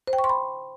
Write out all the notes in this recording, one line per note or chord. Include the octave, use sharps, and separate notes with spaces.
C5
G5
C#6
C6
B5